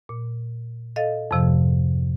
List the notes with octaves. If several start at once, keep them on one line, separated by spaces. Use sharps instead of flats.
A#2
A4 D#5 F5 A6
F2 G#2 C3 F3